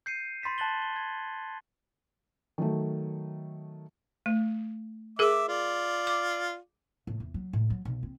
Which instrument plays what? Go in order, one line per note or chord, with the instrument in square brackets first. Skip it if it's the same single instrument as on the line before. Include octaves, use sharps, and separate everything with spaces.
[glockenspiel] G6 C7 C#7 D#7
B5 C6 A6 B6 E7
A5 F#6 A6 F#7 G7
G7
G#6
[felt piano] D#3 F#3 A3
[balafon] A3
[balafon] G#4 A#4 [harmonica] E5 D6
[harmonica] F4 D5
[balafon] D6
[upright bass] A2
E2
F#3
A2
F#3
B1
C4